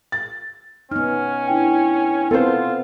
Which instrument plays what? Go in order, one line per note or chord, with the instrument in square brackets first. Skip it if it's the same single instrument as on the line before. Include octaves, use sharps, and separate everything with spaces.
[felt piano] A6
[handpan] B3 D#4 [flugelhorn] C#4 [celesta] F6
[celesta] D4 E4 G5
[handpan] B3 C4 [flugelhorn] F4 [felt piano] A4 C5